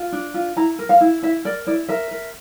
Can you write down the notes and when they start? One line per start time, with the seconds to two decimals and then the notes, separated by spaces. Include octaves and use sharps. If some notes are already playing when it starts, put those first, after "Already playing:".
Already playing: F4
0.12 D4
0.34 F4
0.57 E4 A#5
0.79 A#4
0.89 F5
1.01 E4
1.23 E4 E5
1.45 A#4 D5
1.67 E4 D5
1.89 A#4 E5
2.11 A#4